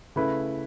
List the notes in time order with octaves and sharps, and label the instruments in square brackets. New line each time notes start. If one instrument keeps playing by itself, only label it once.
[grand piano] C#3 A3 E4 B4